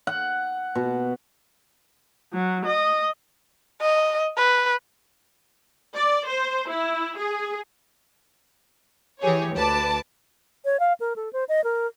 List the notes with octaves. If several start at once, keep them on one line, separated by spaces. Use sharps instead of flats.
F#5
B2
F#3
D#5
D#5
B4
D5
C5
E4
G#4
E3 G4 G#4 C#5
D2 B4 A5 D6
C#5
F5
A#4
A4
C5
D#5
A#4